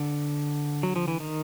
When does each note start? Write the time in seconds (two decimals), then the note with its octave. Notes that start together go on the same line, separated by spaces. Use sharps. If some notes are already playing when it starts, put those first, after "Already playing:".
Already playing: D3
0.83 F#3
0.96 F3
1.08 E3
1.20 D#3